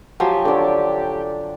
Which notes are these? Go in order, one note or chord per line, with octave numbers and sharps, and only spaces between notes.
F3 F#3 G4 G#5
D3 D4 A4 C5 C#5